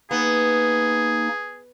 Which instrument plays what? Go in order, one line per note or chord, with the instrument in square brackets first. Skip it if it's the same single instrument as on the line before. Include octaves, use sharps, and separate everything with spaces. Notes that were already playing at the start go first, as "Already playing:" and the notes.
[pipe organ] A#3 D#4 [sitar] B3 [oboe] G#4